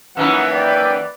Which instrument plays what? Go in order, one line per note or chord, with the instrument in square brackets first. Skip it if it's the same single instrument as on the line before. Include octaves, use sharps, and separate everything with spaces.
[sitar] F#2 E3 D#4 [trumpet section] A#3 B4 [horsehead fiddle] F#5
[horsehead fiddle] D5 [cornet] G5